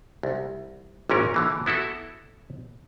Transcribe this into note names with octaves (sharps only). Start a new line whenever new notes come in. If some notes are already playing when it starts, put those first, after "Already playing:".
C2
G#1 A#2 C#4 A#4
D3 E3 A#3
B3 E4 F#4 A4